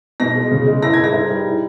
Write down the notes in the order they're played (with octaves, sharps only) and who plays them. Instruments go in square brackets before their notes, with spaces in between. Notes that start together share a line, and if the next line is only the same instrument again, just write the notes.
[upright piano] B2 A#6
G#3
C#3
G#3
E4 A#6
G#3 G#6
A#6
D#4
G3
E4